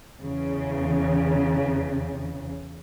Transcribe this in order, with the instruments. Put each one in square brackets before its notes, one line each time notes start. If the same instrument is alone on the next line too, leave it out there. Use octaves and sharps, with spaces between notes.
[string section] E2 C#3